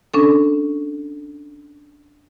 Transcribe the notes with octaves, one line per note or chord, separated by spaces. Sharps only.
C#4 D4 A4